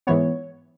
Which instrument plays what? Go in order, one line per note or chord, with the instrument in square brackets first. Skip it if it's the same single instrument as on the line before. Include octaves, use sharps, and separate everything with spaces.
[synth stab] G#2 E3 B3 C#5